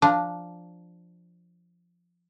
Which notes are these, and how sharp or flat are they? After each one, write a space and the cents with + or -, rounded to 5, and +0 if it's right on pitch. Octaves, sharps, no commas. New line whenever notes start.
F3 +0 D4 +0 A#5 +0